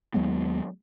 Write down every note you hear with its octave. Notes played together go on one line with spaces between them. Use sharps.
D#2 F#3 G#3 B3